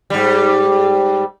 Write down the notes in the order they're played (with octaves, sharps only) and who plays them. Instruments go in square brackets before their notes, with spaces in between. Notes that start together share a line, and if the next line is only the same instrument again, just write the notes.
[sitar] G#2 G3